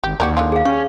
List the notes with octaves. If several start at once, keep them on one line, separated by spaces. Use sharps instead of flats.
G#1 G4
D#2 F#4 G4 A#4 D5
D3 G#3 F4
G#4 F5
G3 C#4 C#6